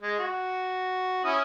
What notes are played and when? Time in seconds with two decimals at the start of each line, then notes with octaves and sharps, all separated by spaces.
0.02 G#3
0.19 F#4
1.25 C#4 E4 D#6